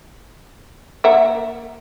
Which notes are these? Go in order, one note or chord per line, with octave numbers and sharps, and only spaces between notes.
A#3 E5 F#5